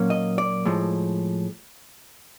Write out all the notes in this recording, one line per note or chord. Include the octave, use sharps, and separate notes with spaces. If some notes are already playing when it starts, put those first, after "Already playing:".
Already playing: A#2 F#3 A#3 C#4
D#5
D5
A2 F3 G#3